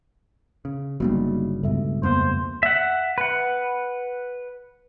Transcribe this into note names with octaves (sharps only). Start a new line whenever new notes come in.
C#3
G1 C#3 F#3 G3 A#3 B3 D#4
C#2 G2 B2 A4 E5
F2 A#3 B3 C5 C6
E5 F#5
B4 F#5